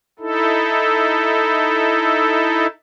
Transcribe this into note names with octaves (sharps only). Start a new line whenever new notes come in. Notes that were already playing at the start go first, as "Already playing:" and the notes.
D#4 E4 A4